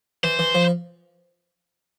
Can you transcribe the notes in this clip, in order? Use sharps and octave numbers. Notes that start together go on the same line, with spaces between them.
E3 C5
E3
F3